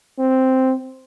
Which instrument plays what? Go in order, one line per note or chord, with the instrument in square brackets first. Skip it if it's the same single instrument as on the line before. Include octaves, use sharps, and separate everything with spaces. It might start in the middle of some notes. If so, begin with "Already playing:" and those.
[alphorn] C4